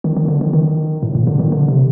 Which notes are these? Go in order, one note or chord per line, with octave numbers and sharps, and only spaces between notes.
D#3
D#3
D3
D#3
D#3
A2
A#2
D3
D#3
D3
C3